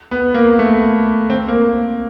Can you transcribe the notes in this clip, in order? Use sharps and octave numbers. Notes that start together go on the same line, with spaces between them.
B3
A#3
A3
C4
A#3